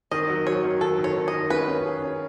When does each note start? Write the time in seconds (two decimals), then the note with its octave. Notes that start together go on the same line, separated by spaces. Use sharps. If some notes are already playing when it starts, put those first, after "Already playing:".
0.11 D#3 D#5
0.29 F#3
0.47 F#3 C#5
0.64 D#3
0.81 D#3 A4
0.99 D#3
1.04 C#5
1.16 D#3
1.28 D#5
1.33 D#3
1.50 C#4 B4
1.68 C#4
1.85 G#4
2.02 C#4